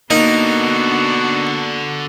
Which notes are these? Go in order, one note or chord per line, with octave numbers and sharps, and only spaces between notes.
D3 A#3 B3 D4 D#4 F#4 A#4